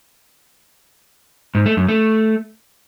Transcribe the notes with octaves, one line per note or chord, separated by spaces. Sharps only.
G#2
A3
F#2
A3